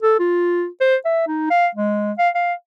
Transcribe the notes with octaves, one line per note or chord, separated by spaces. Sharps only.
A4
F4
C5
E5
D#4
F5
G#3
F5
F5